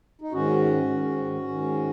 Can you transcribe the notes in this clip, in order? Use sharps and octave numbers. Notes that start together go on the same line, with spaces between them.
D#4
G#2 D#3 C#4 F#4
G#2 D#3
G#2 D#3